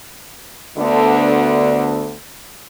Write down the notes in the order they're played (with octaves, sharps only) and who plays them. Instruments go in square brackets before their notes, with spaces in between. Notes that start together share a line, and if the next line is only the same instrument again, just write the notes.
[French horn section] D2 D3 B3